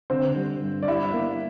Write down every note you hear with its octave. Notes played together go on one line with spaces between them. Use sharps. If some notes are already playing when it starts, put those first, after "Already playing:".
D3 C4 C5
G3
G2
D5
G3 E4 E5
A#3